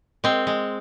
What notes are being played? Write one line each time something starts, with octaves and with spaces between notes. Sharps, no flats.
G#3 C4
G#3